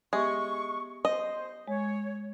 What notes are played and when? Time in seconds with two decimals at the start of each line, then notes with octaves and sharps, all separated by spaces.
0.13 G#3 B3 G4 E5 C#6
1.05 C5 D#5
1.68 G#3 C#5